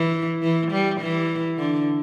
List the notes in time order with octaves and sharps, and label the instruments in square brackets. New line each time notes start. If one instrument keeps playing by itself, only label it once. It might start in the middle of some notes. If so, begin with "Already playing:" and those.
Already playing: [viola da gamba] E3
E3
G3
E3
D3